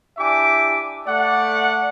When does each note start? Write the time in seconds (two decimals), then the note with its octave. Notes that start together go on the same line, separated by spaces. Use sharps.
0.18 D4 E4 G4 E5 G#5 D6
1.06 A3 D5 F#5